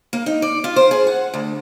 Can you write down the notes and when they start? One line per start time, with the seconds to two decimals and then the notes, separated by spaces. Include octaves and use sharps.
0.13 A#3
0.26 D#4
0.42 D5
0.64 F4
0.76 C5
0.91 G#4
1.07 F#5
1.34 D2